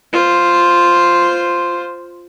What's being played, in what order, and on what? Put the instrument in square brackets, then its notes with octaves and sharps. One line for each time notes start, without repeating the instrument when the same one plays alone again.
[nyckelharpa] F4 C5